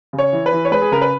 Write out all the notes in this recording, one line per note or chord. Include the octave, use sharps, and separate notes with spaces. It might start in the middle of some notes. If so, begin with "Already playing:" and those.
C#3
C#5
E3
B4
E3
C#5
G#3 B4
G#4
C#3 A#4
B4